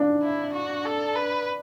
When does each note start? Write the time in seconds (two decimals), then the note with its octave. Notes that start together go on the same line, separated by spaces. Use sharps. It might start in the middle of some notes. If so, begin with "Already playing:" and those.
Already playing: D4
0.23 E4
0.53 F#4
0.85 A4
1.16 B4